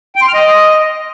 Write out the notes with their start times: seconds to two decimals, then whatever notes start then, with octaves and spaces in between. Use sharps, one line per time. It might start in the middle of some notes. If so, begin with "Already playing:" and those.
0.16 G5
0.22 C6
0.28 F6
0.34 D#5